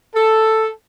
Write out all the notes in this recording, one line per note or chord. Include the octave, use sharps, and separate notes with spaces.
A4